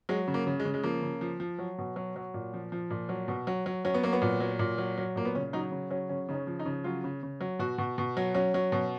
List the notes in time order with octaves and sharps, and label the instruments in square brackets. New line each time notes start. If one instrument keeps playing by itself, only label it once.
[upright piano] F#3 G#3
C#3
A#3
C#3
G#3
C#3
G#3
F3 A#3
C#3
F3
F3
F#3
B2
F#3
F#3
A#2
F3
F3
A#2
F#3
B2
F#3
F#3
F#3 C#4
B3
F#3 A#3
B3
A#2
F#3
A#2
F#3
F#3
A#2 A#3
B3
C#3 C#4
F#3 D#4
C#3
F#3 C#4
C#3 C#4
C#3 D#4
C#4
F3
D#4
C#3
F#3 F4
C#3
C#3
F#3
B2 F#4
B2
B2
F#3
F#3 C#4
F#3
B2